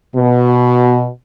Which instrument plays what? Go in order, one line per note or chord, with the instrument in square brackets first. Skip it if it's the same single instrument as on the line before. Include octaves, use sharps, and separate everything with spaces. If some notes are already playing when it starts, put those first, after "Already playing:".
[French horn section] B2